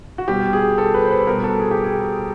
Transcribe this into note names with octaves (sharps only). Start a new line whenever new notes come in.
F#4
B2 G3 G4
G#4
A4
B4
C5
B4
B2 G3 A#4
A4
G#4
G4
G#4